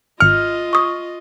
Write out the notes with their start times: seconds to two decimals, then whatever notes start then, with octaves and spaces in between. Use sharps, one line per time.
0.20 G#1 F4 D#5 F6 C#7
0.73 C#6 D#6